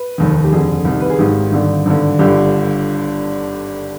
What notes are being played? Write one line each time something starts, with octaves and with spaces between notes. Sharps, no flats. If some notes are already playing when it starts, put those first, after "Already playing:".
Already playing: B4
F1 D#2 D#3
G4
F1 F2 D3 G#4
C2 C3 D#3
B4
G#4
G#1 G#2 D#3 G4
G#1 G2 D3
G#1 G2 D3
G1 G2 D3 G4